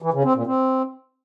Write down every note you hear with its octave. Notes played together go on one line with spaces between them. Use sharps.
E3
C#3
C4
A#2
C4